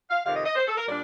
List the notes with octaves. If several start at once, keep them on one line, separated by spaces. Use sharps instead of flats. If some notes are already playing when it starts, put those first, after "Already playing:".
F5
F2 C3 D#3 F5
D#5
D#5
C5
A4
A#4
A#2 G3 D4 D5